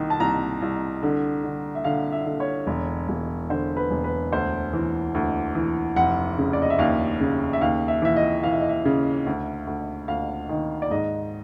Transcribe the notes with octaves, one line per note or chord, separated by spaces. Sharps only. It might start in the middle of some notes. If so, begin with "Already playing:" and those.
Already playing: C2 D#3
A5
C2 A#5
C2
D3
D3
E5
D3 F5
E5
D3
C#5
E1
E1
D3 C5
B4
E1
B4
D2 C5
E3
D2
E3
F1 F#5
C#3
D5
D#5
E5
D#2 F5
C#3
E5
D#2 F5
E5
E3 E5
D#5
E3 F5
E5
D#5
E5
C#3
D2
D2
D2 F5
D#3
D5
G#2 D#5